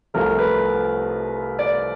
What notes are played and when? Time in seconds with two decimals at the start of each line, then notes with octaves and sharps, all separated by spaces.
0.14 C2 C3 F3 A3 A#4
0.38 B4
1.59 D5